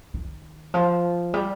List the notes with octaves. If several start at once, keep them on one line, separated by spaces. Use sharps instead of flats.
D#3
F3
G3